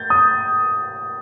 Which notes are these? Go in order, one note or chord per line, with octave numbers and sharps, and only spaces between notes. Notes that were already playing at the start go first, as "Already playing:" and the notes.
Already playing: G6 A6
D#6